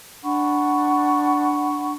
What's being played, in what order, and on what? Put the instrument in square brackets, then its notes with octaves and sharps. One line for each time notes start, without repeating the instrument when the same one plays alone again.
[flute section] D4 F#5 B5 C#6